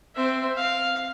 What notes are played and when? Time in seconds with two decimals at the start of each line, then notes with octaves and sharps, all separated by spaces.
0.15 C4 E5
0.56 F5